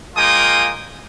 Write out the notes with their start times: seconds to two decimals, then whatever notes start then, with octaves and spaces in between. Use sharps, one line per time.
0.16 G#3 A#3 F4 G5 G#5 D#6